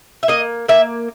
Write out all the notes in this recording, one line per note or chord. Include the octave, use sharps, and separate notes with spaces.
E5
A#3 D#5
A#3 E5